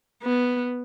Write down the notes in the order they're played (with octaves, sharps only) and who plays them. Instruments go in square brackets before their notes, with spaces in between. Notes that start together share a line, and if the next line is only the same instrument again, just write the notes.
[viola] B3